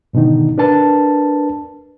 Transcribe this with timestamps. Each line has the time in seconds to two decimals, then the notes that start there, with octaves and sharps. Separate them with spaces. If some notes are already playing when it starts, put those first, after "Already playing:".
0.13 G#2 B2 D3 D#3 D#4
0.58 D4 A#4 B4 A5